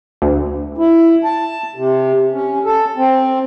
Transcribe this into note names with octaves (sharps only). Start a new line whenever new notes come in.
D2
E4
A5
C3
C#4
A4
C4